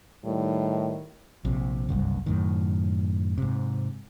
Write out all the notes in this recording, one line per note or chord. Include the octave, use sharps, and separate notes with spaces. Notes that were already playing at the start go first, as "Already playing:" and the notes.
A2 D#3 G3
A#1 C3
F#1 C2 G2
F#2 A2 D#3
G#2 C3